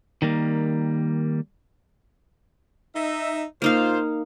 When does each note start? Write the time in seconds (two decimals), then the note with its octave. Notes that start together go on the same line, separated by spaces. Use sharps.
0.22 D#3 G3 A#3
2.95 D#4 E5
3.62 A#2 A#3 D#4 F4 C5 F5